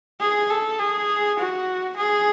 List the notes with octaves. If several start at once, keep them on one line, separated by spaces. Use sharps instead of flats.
G#4
A4
G#4
F#4
G#4